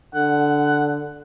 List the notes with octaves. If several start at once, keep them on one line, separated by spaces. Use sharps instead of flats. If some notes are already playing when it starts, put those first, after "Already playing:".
D3 F#5